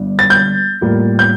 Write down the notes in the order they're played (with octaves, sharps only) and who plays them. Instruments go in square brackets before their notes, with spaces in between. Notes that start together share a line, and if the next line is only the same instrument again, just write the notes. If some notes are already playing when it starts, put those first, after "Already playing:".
Already playing: [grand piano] G1 G2
[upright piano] A6
G6
[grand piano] A2 G3 A#3 F4
[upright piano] G6